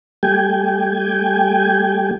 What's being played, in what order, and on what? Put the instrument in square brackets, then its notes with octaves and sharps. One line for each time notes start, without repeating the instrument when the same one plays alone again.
[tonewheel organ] G3 A3 G4 G5 G#5